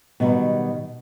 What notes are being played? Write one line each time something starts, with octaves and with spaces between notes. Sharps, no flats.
B2 D#3 F#3 G3